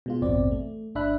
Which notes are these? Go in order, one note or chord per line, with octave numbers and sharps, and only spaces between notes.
B2 G#3 F4
A1 E2 G2 B2 C4 D5
A3
G#1 D4 E5 B5 F#6